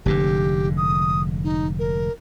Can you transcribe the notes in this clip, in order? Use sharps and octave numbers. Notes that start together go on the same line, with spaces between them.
F1 G#2 D3 G4
D#6
D#4
A#4